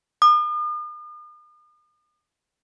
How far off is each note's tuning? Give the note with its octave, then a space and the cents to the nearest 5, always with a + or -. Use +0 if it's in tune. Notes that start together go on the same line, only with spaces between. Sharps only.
D#6 -45